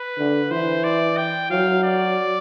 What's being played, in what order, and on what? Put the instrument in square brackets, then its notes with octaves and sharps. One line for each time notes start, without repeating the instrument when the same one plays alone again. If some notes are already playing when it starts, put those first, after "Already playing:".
Already playing: [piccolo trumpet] B4
[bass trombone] D3
[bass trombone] E3 [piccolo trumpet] C5
[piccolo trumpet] D5
G5
[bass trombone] F#3 [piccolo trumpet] F5
[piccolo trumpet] D5